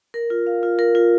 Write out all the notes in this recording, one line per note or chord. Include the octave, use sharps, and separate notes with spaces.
A#4
F4
F5
F4
A#4
F4